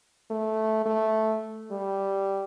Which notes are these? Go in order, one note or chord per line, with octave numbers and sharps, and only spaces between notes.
A3
A3
G3